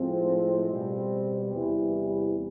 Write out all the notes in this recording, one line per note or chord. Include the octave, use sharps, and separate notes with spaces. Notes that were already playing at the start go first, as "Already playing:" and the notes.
Already playing: A2 F3 G#3 C4
B2 G3
E2 C3 E3 G3